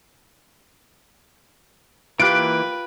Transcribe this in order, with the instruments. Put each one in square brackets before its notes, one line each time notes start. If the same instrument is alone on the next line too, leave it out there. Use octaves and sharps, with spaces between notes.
[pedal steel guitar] E3 A#3 F#6 [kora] F4 G4 [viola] B4 [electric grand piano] D7